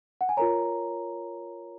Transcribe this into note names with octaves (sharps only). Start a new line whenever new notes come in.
F#5
G#5
F4 A#4 C#5 A#5